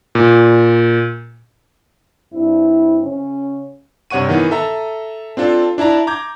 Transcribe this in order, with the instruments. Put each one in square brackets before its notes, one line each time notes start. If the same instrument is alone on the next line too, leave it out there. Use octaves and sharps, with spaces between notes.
[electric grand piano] A#2
[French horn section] G2 C4 E4
C#3 C#4
[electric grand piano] G2 C3 C#5 F#5 C#6 D#7
D#3 E3 B3
A4 E5 A#5
C4 D4 F4 A4
D4 E4 A5 A#5
A#5 D6 G6 G#6